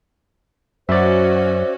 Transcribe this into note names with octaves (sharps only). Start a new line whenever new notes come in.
F#2 C#4 F#4 C5 D5 E5